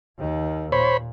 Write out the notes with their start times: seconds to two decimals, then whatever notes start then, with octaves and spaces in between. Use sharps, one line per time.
0.18 D#2 D#3
0.72 A#2 C5 C#5 B5